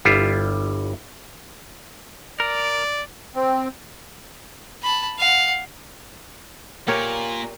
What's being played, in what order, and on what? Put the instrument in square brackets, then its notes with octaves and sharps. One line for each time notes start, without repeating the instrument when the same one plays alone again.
[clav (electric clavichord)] G1 G3 E4 F4
[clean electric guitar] A#4 [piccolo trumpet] D5
[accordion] C4
[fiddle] A5 B5
F5 F#5
[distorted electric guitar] A#2 [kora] G4 A#4 C#5